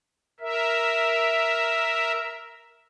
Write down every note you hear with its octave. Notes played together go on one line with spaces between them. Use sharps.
A#4 E5